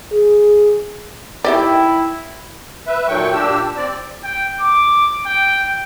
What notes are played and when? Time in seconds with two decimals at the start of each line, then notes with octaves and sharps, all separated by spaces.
0.12 G#4
1.45 D#3 E4 G4 D5 E5 G5
2.87 B4 E5
3.08 A#2 D#3 F#3 A3 G5 C#6
3.33 A#2 D4 G4 E6
3.77 C4 D5
4.24 G5
4.60 D6
5.26 G5